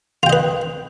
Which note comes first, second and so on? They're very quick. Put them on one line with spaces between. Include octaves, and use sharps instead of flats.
F4 G5 D#5 B4